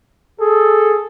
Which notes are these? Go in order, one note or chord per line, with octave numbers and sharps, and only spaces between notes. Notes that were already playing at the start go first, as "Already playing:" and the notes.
G#4 A4